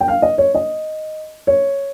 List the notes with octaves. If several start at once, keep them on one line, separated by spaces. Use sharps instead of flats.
G5
F5
D#5
C#5
D#5
C#5